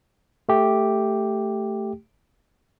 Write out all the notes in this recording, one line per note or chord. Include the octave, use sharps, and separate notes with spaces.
A3 G4